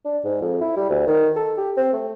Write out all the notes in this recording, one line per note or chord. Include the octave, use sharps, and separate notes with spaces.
D4
G#2
F2
E4
G3
D2
D#3
A4
G4
C4
A3